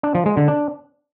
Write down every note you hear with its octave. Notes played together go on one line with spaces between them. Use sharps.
D4
F3
G#3
D3
D4